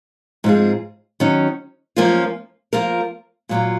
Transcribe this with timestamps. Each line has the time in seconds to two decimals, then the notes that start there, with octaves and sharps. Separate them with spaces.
0.44 G#2 F3 C4 F4 G#4
1.20 D#3 F#3 C#4
1.96 F#2 F3 A#3 C#4 F4
2.73 F3 A#3 F4 A#4
3.49 A#2 F#3 A#3 F4